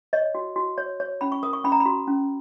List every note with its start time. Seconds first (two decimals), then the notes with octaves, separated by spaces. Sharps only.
0.13 C#5 D#5
0.35 F#4
0.56 F#4
0.78 C#5
1.00 C#5
1.21 C#4 B5
1.32 C#6
1.43 A#4 D#6
1.53 C#6
1.64 C#4 B5
1.72 A#5
1.80 B5
1.86 F#4
2.07 C#4